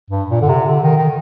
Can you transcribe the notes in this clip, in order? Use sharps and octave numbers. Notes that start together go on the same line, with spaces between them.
G2
A#2
D3
C3
D3
D#3
D#3